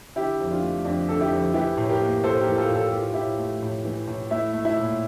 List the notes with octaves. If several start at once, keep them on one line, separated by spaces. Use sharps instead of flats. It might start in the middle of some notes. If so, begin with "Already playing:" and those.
D3 E4 G4
F2
D4 F4
A3
F2 D4
D3 A4
E4 G4
F2
E3 E4 G4
A2
G4 A#4
A#3
A2 A4 C5
G4 A#4
E3
F4 A4
A2
A4
G4
E3
F4
A2 E4 G4
A3
A2
E3
A2
A3 E4
A3
E4
A#2